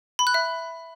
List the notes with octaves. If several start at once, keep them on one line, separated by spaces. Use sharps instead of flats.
B5
F#6
E5